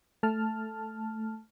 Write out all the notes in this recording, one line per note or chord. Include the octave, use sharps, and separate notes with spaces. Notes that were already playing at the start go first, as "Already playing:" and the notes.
A3 A5 F6